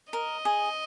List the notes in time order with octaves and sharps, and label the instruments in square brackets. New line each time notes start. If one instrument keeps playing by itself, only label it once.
[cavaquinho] A#4 [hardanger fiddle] D#5
[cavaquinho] G#4